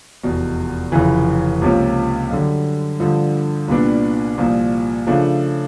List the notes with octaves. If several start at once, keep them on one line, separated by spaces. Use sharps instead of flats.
F1 E2 B2
F1 F2 C#3 E3
C#2 C3 F3 A#3 C#4
F#2 D3 G3
G2 D3 F3
C2 A#2 G3 B3 D4
C2 A#2 F3
C#3 F3 A3 D4